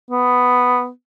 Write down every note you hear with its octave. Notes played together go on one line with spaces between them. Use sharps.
B3